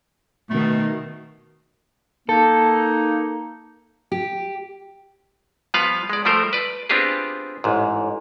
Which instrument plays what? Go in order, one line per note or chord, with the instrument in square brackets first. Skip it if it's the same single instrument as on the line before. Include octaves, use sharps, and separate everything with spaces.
[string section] B2 D#3 [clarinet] A3
[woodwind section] A#3 D#4 [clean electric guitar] A4
[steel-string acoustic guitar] G4
[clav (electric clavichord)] F3 G3 B3 B4 F5
G#3 D5
F3 G3 A3 A#4 C5
B4 D5
B3 C4 D4 F4 G4 G#4
A1 G#2